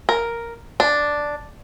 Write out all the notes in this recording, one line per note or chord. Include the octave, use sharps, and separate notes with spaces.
A#4
D4